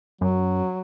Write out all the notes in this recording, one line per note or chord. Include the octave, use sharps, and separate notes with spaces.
F#2 F#3